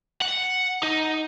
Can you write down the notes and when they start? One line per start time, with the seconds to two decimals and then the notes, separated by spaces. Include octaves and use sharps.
0.21 F#5
0.83 D#4